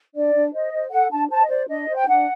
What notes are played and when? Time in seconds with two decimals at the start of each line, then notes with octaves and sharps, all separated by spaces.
0.15 D4 D5
0.34 D4
0.54 C5 D#5
0.73 C5
0.92 A4 F#5
1.10 D4 A5
1.30 C5 A5
1.43 D#5
1.49 C5 D5
1.68 D4 D#5
1.88 C5
1.96 G5
2.06 D4 F#5